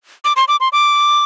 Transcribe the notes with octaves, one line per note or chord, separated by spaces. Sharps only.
D6
C6
D6
C6
D6